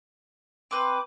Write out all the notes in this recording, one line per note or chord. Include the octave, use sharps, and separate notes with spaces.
C4 B4 D6